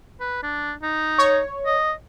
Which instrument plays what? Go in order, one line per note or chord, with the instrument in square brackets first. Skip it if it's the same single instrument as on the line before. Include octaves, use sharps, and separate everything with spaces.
[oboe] B4
D4
D#4
[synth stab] C#5
[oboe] D#5